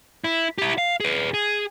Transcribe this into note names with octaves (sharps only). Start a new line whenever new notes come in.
E4
E4 G4
F5
G#4 B4
G#4